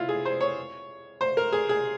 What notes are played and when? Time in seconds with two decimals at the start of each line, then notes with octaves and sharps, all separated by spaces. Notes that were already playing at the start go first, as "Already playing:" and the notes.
Already playing: E4 F4
0.09 G#4
0.25 C5
0.41 C#5
1.21 C5
1.37 A#4
1.53 G#4
1.69 G#4